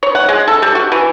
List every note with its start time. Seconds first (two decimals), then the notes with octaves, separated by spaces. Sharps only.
0.03 C#5
0.15 F#5
0.29 G#3
0.48 A4
0.62 G3
0.75 F#4
0.92 E3